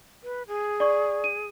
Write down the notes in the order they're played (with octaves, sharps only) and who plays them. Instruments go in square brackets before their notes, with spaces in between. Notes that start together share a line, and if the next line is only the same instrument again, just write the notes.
[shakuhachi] B4
G#4
[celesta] D5 C#6
D#7